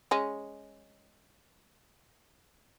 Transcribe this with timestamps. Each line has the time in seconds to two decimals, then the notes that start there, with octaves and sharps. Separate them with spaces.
0.11 G#3 C#4